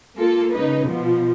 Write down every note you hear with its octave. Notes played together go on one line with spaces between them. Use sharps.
A#3 F4 A4
C#3 D#4 B4
B2 F3 B3